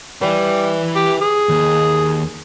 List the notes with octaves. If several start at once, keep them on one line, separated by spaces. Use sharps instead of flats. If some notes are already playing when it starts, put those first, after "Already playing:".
G3 E4 B4
G4
G#4
D#2